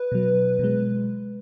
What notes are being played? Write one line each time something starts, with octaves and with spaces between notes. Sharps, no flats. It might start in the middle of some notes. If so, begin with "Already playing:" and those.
Already playing: B4
B2 F#3
B2 G#3